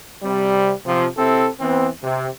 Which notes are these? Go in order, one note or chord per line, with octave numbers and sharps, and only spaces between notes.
C3 G3
C3 F3
C3 C4 E4 A4
E3 B3 C4
C3